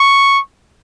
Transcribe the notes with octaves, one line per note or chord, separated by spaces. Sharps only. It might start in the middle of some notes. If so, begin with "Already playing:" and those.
Already playing: C#6